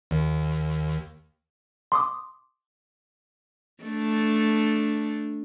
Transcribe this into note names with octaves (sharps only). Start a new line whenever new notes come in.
D#2
C6 D6 D#6
A3 D4